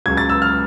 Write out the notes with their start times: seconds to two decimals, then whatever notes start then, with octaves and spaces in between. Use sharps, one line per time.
0.06 C#2 C#3 F#3 G#6
0.17 A6
0.30 E6
0.42 F6